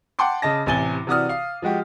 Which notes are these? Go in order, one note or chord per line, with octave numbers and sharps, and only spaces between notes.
F#5 G5 A5 C6 D6
C#3 D#5 A5 A#6
A1 C3 G#5 A6 G7
C3 E3 F#4 D5 D#6 F6
F5
F3 G#3 F#4 G4